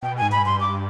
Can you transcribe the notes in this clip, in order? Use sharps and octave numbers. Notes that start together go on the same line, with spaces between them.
B2 G5
G#2 G#5
B5
G2 C6
D6